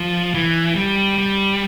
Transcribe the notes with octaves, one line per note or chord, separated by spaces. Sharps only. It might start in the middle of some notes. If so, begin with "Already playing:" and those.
Already playing: F3
E3
G3
G3